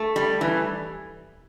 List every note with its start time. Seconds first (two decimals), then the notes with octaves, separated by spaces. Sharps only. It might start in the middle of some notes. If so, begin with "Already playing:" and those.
Already playing: A3
0.16 G3
0.41 E3